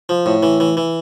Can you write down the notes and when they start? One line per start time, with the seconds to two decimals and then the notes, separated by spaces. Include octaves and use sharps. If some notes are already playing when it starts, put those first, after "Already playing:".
0.09 F3
0.26 A2
0.43 E3
0.60 E3
0.77 E3